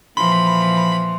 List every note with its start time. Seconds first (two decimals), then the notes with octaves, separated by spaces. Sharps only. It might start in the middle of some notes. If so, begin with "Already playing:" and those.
0.17 A#2 E3 F3 B5 C6